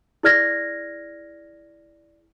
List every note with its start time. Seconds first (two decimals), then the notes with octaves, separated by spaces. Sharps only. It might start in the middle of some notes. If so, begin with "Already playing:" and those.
0.23 E4 G#4 D5 F6 G#6 A#6